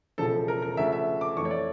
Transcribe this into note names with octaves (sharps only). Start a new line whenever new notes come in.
E1 E2 C#3 F3 A4
A#4
A#4
D2 C#3 F3 E5
E5
D6
F2 E3 A3 C#6
C#5
D5